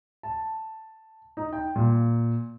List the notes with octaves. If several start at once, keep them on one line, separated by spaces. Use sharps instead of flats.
A5
D#4
G5
A#2